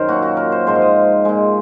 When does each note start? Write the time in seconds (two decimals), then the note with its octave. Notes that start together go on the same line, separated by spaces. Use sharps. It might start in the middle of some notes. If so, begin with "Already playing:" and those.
Already playing: F#2 D#3 A#4 C5
0.08 A#2 F#3 F#4
0.23 F#4
0.37 A#4
0.52 C5
0.67 G#2 F3 G#3 C5
0.75 F5
0.82 D#5
1.25 A#2 G#3